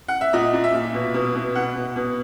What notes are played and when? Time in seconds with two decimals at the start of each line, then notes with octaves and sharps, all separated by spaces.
0.08 F#5
0.21 E5
0.33 A#2 D#5
0.54 A#2
0.64 E5
0.74 A#2
0.94 B2
1.14 B2
1.35 B2
1.55 B2 F#5
1.76 B2
1.96 B2